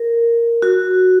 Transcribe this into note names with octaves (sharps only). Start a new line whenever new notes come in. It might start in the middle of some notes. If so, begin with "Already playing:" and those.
Already playing: A#4
F#4